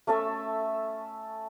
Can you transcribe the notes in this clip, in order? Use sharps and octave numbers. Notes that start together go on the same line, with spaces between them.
A3 C#4 A4 E5